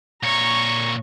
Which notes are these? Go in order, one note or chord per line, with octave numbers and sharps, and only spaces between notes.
A#2 C#5 A#5 C#6